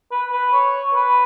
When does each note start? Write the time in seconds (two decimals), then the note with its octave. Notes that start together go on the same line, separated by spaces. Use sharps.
0.12 B4
0.32 B4
0.53 C#5
0.94 B4